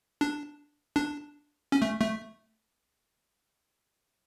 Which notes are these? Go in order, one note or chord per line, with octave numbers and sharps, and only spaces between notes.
D4
D4
C#4
A3
A3